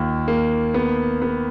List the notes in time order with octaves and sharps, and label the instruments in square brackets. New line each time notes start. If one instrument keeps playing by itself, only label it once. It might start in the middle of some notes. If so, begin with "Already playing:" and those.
Already playing: [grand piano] D#2 A#3 F4
A#3
B3
B3